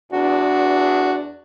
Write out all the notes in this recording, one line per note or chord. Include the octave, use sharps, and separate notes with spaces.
E2 D4 F#4